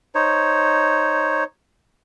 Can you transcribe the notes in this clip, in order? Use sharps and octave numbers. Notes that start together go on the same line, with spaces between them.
D#4 C5 C#5